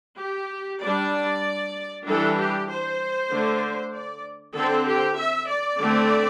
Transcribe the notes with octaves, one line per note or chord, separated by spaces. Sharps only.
G4
G3 D4 D5
E3 G3 D4 A4
G4
C5
D3 A3 D4
D5
D3 C4 A4
G4
E5
D5
D3 A3 C4